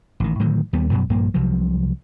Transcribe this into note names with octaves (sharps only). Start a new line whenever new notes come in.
A1 D#3
A2 D3 D#3 F#3
D#2 G3 B3
F#2 B2 F#3 G3
A#1 G2 A#2 A#3
C2 C3 F3 F#3